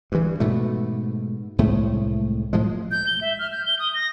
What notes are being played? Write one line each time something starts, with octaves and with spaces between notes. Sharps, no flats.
G2 E3
G#2 B2 A3
C2 A2 G#3 A3
A2 F3 G#3
G6
G7
E5
F6
G6
G7
D#6
A#6